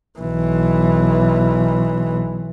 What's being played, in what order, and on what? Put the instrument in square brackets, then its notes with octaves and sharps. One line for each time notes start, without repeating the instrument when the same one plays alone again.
[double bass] B1 E3